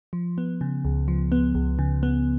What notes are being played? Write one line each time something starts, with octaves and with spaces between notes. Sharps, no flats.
F3
B3
C#3
C#2
F3
B3
C#2
C#3
B3